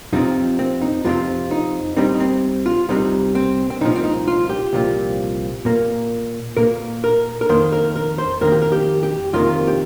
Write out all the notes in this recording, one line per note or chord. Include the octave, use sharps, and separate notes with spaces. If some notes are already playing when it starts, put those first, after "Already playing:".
F2 C3 F3 C4 D#4
C4
D#4
F2 C3 F3 C4 F4
D#4
C2 C3 G3 C4 D#4
D#4
C4
F4
C2 C3 G3 C4 D#4
C4
C4
C2 A#2 F3 D#4
C4
D#4
F4
G4
C2 A#2 F3
A#2 A#3
A#2 A#3 A#4
A#4
A#4
F2 D#3 A#3 C5
A#4
A#4
C5
F2 D#3 A#3 A#4
G4
A#4
G4
G4
F2 C3 D#3 A#3 F4
G4